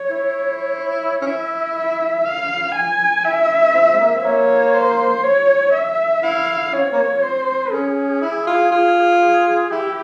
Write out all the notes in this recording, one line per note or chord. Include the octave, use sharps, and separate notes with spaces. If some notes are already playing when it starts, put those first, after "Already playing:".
Already playing: C#5
E4
C#5
C#4
E4 E5
E5
F5
G#5
E4 E5
C4
G#3
A#3
C4
A#3 C#5
C5
C#5
E5
E4 F5
C#4 C#5
C4
A#3
C4
C5
C#4 G#4
E4
F4
F4
G#4
E4 G4